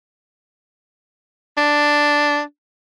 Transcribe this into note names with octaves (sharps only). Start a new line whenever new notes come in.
D4